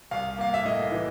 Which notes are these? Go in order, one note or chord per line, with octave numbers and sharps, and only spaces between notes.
C2 F5
A#3 F5
E5
A2 D#5
E3